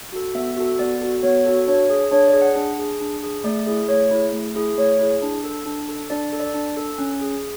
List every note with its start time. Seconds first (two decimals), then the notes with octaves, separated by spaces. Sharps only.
0.12 F#4 A4
0.35 B3 E5
0.57 F#4 A4
0.79 B3 D5
1.01 F#4 A4
1.23 B3 C#5
1.45 F#4 A4
1.67 D4 C#5
1.90 G#4
2.12 D4 C#5
2.27 D5
2.33 G#4
2.42 F#5
2.55 D4
2.79 G#4
3.00 D4
3.23 G#4
3.44 A3 D5
3.67 E4 G#4
3.88 A3 C#5
4.11 E4 G#4
4.33 A3
4.55 E4 G#4
4.78 A3 C#5
4.99 E4 G#4
5.22 D4
5.44 A4
5.66 D4
5.89 A4
6.10 D4 D5
6.33 A4
6.40 D5
6.54 D4
6.77 A4
6.98 C#4
7.21 G#4